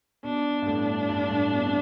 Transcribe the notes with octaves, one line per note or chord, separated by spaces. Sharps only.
B2 D4
G2
A2
G2
A2
B2
C3